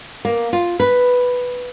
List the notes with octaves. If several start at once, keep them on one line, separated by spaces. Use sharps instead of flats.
A#3
F4
B4